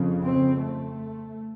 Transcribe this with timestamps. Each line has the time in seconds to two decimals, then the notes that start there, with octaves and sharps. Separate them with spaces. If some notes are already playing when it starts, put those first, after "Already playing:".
Already playing: F2 C#3
0.22 C4
0.61 A3